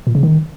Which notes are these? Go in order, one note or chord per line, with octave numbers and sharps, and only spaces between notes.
A#2
C#3
D#3